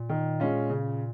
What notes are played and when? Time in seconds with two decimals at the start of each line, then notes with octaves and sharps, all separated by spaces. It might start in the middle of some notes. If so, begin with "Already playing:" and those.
Already playing: A#2
0.09 D#3
0.40 G#3 C#4 F4
0.70 C#3